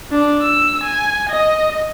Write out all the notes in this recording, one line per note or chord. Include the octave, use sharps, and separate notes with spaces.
D4
E6
G#5
D#5